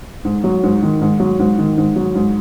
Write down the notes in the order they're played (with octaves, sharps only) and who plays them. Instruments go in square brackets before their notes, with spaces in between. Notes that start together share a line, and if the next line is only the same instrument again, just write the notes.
[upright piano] G#2
F#3
G#2
D#3
G#2
F#3
G#2
D#3
G#2
F#3
G#2